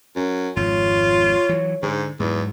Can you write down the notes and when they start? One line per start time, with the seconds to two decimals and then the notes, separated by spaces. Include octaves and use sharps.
0.16 F#2
0.57 G#1 F2 G#2 F4 C#5
1.49 E3 F#3
1.83 G#2 D3
2.20 E2 G#2 F#3